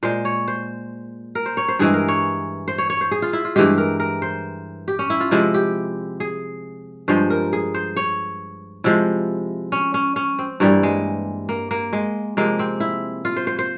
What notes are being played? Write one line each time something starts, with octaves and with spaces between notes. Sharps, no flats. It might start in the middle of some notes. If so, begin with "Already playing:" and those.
A#2 G#3 C5
C#5
C5
A#4
C5
C#5
C5
G2 E3 G#3 G#4
A#4
C#5
C5
C#5
C#5
C5
G#4
F4
E4
F4
G2 E3 G#3 G4
A#4
A#4
C5
G4
C#4
E4
F4
C3 F3 G#3 E4
G4
G#4
G2 F3 G#3 C5
A#4
G#4
C5
C#5
C3 F3 G#3 E4
C#4
C#4
C#4
C4
G2 E3 G3 A#3
G#3
A#3
A#3
G#3
C3 F3 G#3 A#3
C4
E4
F4
C5
C5
C5